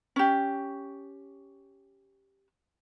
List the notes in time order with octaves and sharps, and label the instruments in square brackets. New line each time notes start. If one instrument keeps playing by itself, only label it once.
[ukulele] C#4 G4